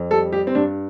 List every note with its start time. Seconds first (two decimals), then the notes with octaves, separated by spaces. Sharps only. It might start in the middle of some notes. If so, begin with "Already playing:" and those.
Already playing: F2
0.11 G3 A4
0.32 G3 G4
0.47 C4
0.55 G2 D4